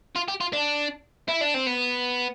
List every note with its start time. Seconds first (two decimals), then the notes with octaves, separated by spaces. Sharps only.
0.16 F4
0.28 G4
0.41 F4
0.53 D4
1.29 E4
1.41 D4
1.54 C4
1.66 B3